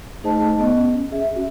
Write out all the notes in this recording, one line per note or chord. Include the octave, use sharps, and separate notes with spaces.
A3 D#4 G#4 C5 D#5 A5
B3 D#5
C#4
G#4 E5
C#4 F#4 E5